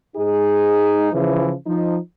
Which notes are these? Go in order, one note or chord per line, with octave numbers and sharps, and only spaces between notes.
G#2 D#4 G#4
C#3 E3 F3
F3 D#4